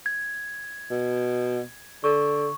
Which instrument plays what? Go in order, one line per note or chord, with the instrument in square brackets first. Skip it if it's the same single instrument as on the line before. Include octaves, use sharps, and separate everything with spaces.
[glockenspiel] G#6
[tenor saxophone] B2
[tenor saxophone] D3 [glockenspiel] C#6